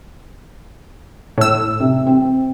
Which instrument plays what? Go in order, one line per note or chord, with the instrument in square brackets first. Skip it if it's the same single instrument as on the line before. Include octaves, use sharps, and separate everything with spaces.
[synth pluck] A2 E6
[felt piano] C3
C4